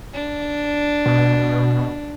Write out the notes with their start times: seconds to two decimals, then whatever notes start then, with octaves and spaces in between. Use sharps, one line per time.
0.14 D4
1.06 B2